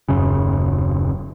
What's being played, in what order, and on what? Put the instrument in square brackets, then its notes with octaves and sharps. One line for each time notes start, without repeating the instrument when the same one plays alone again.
[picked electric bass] D#1 F#2 C#3